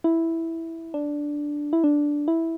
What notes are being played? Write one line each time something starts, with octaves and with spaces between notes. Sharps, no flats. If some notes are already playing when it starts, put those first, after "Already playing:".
E4
D4
E4
D4
E4